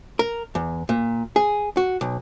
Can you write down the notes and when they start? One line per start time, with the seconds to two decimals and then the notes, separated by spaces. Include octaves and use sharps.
0.19 A#4
0.55 E2
0.89 A#2
1.36 G#4
1.77 F#4
2.01 B1